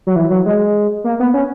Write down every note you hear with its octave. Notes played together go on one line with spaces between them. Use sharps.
F#3
E3
F#3
G#3
A#3
B3
C#4